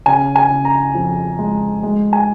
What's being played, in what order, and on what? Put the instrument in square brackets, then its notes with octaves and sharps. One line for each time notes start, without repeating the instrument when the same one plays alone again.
[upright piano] C#3 G#5
G#5
C#3
A#5
F2
G#3
G#3
G#5